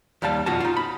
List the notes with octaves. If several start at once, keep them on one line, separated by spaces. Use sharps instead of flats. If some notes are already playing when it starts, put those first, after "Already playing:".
D#2 G3 F5 A5
B1 F2 F4 F#4 A5
D#4 F4
B5